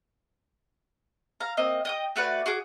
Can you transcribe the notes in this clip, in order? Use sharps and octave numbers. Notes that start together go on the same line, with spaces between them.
F5 A#5
A#3 C4 D#5
D#5 G5 D#6
A3 F#4 B4 D5
F#4 G#4 D6